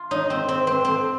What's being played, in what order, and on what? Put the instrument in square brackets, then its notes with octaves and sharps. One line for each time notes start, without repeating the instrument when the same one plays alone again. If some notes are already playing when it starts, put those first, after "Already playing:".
Already playing: [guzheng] F4
[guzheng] D#4 [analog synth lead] C#5
[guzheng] C4 [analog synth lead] C5
[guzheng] C4 [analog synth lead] C5
[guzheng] C4 [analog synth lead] B4
[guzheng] C4 [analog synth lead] A4